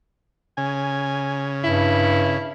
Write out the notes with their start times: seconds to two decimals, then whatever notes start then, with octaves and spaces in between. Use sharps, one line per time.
0.57 C#3 G#5
1.64 G2 E4